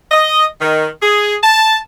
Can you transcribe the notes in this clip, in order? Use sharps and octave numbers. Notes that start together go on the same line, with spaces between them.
D#5
D#3
G#4
A5